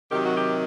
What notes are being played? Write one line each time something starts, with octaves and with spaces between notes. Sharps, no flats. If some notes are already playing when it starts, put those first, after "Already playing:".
C3 D#3 F#3 G4
F#4
G4